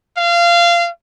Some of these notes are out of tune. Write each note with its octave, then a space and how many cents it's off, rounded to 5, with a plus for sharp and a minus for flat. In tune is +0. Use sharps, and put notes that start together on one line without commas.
F5 -20